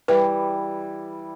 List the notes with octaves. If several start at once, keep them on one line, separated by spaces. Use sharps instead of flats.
E3 G3 B4